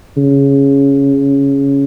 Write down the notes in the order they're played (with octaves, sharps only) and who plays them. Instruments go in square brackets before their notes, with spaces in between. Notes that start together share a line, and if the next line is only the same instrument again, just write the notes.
[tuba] C#3